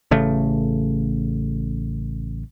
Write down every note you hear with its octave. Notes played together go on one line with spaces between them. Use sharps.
A1 C#3 A3